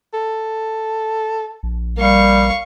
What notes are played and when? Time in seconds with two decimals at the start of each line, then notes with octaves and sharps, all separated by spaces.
0.14 A4
1.63 A#1
1.98 G3 A#3 F5 C#6